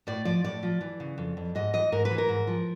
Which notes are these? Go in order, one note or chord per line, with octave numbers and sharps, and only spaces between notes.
A2 D5
F3 D5
A2 D5
F3
E3
C#3
F2
F2
G#2 D#5
E3 D#5
G#2 A#4
B4
E3
A#4
G#2
F3